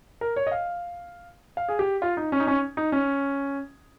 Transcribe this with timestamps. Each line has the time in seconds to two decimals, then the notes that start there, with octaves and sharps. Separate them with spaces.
0.21 A#4
0.36 C#5
0.47 D#5
0.52 F5
1.57 F5
1.69 G#4
1.79 G4
2.02 F4
2.17 D#4
2.32 C#4
2.40 D#4
2.47 C#4
2.77 D#4
2.92 C#4